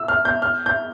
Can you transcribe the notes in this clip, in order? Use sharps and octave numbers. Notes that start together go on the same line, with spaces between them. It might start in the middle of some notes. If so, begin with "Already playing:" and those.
Already playing: E6
F6
G6
F6
G6